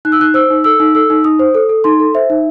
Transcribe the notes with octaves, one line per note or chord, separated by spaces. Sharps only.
D#4 F#6
E6
D#4 F#6
C5 E6
D#4
A4 E6
D#4
A4 E6
D#4
D#4 D#6
C5
A4
A4
D#4 C6
A4
C5 E5
D#4